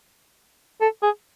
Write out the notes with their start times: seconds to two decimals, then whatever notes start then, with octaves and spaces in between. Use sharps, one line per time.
0.81 A4
1.03 G#4